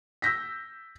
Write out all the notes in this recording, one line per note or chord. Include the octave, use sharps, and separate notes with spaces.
E6 G6 A#6 B6